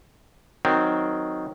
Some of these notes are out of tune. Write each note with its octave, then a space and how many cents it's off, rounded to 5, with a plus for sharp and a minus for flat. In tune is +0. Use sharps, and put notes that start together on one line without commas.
D#3 +0 F#3 +0 C4 -10